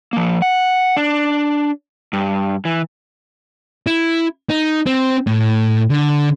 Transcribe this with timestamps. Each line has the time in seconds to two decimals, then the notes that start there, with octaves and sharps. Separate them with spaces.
0.13 F3 A#3
0.42 F#5
0.97 D4
2.13 G2
2.65 E3
3.87 E4
4.49 D#4
4.86 C4
5.27 A2
5.90 D3